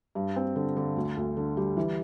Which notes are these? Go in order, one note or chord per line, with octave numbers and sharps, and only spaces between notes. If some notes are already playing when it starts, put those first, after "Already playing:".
G2
C4
D3
D3
D2
D2
D3
G3
E3